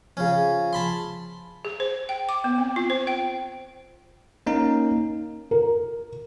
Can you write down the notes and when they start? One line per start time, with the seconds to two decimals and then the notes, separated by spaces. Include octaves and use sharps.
0.17 C#3 F3 C#4
0.73 A5 B5 C6
1.65 G#4
1.80 C5
2.09 G5
2.29 D6
2.44 B3
2.58 C4
2.76 F4
2.90 C5
3.07 G5
4.47 A#3 C#4 D#4 A#4
5.51 A#4